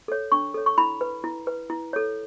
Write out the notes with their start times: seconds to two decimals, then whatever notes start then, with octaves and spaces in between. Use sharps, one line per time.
0.08 A4 C#5
0.32 D4 C#6
0.54 A4 C#5
0.66 C#6
0.78 E4 B5
1.01 B4
1.24 E4
1.47 B4
1.70 E4
1.93 A4 C#5